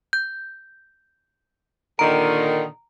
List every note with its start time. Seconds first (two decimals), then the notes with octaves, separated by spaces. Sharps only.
0.13 G6
1.99 A#2 D3 D#3 A#5 D7